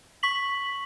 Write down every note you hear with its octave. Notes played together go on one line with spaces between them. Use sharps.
C#6 B6 F#7